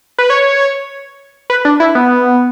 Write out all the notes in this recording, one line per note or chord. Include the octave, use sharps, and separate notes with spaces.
B4
C#5
B4
D4
E4
B3